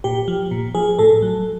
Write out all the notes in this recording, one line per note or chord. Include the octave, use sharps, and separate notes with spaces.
A#2 G4
F3
A#2
F3 G#4
A2 A4
F#3